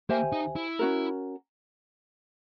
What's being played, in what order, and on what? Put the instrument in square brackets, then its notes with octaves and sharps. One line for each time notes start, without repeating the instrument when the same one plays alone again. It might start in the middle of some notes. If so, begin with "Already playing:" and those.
[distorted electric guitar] A#3 [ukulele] G4 C5 E5 G#5
[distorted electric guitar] D#4
E4
[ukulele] C#4 F#4 A#4